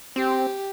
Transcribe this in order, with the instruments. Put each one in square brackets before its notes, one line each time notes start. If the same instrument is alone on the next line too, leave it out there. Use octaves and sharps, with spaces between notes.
[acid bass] C4 [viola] G4